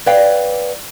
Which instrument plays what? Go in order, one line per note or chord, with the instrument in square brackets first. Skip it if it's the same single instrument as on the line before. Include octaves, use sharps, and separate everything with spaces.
[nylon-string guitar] B4 C#5 D5 F5 G5